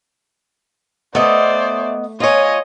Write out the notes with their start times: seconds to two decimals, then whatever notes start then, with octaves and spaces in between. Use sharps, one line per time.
1.15 A3 B3 C5 D5 D#5
2.20 F4 C#5 D#5 G#5